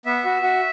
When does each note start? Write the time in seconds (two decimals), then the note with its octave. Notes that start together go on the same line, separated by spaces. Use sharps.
0.05 B3 E5
0.25 F#4
0.42 F#4